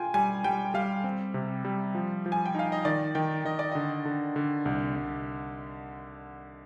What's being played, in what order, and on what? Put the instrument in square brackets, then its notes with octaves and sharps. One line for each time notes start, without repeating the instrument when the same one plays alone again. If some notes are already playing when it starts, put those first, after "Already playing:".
Already playing: [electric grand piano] F4 [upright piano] G5 G#5
[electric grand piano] G3 [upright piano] G#5
[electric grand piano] G3 [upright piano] G5
[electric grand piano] G3 [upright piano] F5
[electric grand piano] C4
C3
G3
F3
F3
[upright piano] G#5
G5
[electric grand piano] D#4 [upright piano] F5
[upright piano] D#5
[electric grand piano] D#3 [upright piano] D5
[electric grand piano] D#3 [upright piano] G5
[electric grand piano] D#3 [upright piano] D#5
[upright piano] D5
[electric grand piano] D3 [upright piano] D#5
[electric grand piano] D3
D3
C2
C2